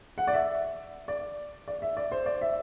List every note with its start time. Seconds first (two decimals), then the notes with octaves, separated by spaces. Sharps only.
0.18 F#5
0.27 D5
0.33 E5
1.08 D5
1.68 D5
1.82 E5
1.97 D5
2.12 C5
2.26 D5
2.42 E5